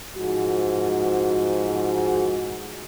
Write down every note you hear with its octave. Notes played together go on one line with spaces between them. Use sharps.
G#2 F3 F#4